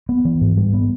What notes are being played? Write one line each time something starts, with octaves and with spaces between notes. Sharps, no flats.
B3
E3
G#2
G3
B3